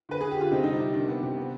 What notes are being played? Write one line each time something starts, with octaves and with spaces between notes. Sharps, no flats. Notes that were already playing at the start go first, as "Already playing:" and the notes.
D3 B4
D3 G#4
G4
D3 F4
C3 C4 D#4
G3 D#4
D4
C3
D#3 D4
B3
C3
B3